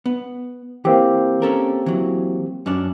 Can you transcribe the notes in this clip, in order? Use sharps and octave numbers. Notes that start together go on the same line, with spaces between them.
B3
E3 A#3 C4 G4
C#4 A4 A#4
E3 F#3
F#2 C#4 D4